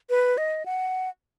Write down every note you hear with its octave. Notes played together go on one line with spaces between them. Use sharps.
B4
D#5
F#5